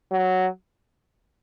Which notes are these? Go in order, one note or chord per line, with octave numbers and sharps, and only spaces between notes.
F#3